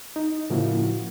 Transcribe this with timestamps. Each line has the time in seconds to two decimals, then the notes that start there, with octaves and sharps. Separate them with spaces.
0.16 D#4
0.50 A2 C#3 F3 A#3 E4 F#4